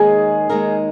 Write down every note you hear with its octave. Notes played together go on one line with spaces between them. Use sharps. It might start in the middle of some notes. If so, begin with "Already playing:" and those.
Already playing: D#2 D#3 G#3 D#4 G#4 A#4
D#2 D#3 G#3 D#4 A#4